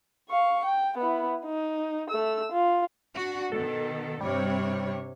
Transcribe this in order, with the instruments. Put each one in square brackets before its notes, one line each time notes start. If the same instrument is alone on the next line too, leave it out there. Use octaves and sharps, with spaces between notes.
[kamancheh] F5 C#6
G5
B3 E4
D#4
A3 E6
F4
[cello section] D4 F#4
[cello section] B2 D#3 [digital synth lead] A4
[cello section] G2 C3 C#5 [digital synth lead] G3